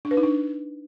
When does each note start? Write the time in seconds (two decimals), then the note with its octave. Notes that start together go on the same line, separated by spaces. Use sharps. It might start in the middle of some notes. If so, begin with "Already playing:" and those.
0.05 D4
0.11 B4
0.17 D#4
0.23 D4